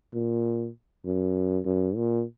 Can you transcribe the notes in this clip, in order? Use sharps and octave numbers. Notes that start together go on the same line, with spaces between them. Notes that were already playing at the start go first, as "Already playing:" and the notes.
A#2
F#2
F#2
A#2